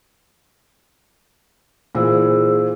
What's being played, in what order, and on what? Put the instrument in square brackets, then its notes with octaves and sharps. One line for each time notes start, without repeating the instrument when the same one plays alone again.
[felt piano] A#2 E3 [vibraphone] G#4 C5 E6